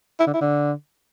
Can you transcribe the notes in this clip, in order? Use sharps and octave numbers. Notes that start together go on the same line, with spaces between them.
E4
D3
E4
D3